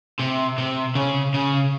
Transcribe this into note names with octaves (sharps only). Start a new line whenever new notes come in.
C3
C3
C#3
C#3